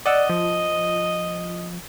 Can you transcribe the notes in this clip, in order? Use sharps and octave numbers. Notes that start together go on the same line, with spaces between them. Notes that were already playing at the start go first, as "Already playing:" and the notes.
D5 D#5 F#5 E6
F3